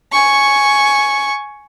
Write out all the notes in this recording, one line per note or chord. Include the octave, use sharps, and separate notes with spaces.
G#5 C#6